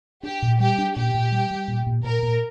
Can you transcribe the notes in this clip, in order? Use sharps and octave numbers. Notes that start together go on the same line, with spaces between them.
D4 G4
A#2
G3 G4
D4
A#2 G4
A#2
G3
G3
A#2
A#2
A#2 A#4
A#2